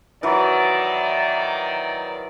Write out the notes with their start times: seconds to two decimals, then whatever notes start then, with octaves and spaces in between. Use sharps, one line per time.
0.23 D#3 E3 F#3 D5